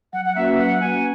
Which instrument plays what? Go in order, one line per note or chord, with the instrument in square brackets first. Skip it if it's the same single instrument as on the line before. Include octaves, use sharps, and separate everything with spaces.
[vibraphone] F#3 [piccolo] F#5
[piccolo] F#5
[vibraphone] A#3 C#4 F#4 B4 [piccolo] E5
[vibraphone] F#3 [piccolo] F#5
[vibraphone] A#3 C#4 F#4 B4 [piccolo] G#5